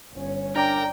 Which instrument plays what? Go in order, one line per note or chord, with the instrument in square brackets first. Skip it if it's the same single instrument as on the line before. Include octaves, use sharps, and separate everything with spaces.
[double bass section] G1 C#4
[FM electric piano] D4 D5 A#5 [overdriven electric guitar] A#4 [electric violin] G5